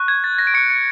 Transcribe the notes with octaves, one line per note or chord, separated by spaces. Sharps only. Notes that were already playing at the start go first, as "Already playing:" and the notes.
Already playing: C#6 F#6
G#6
A6
A#6
D7
C#6 F#6 C#7
C#7